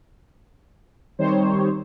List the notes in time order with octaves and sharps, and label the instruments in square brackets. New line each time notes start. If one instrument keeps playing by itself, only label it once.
[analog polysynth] D#3 G3 C4 D#4 C5 C#5